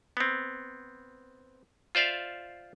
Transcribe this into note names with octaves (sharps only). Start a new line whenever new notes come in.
B3 C4
F4 C5 D5 E5 F5